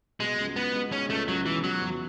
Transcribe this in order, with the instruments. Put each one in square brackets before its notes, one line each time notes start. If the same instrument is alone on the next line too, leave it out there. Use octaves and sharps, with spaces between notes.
[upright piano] B2 [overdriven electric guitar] G#3
[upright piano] C#2
[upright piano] G#3 [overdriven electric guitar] B3
[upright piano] G#3
[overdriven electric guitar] C#4 [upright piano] D#4
[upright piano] C#2 [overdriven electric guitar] A3
[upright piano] C#2 [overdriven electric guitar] F#3
[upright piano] B2 [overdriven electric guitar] E3
[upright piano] B2 [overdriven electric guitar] F#3
[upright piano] E2